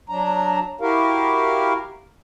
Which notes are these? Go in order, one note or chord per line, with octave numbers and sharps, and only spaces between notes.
F#3 D4 A#5
E4 F#4 G4 A#4 F5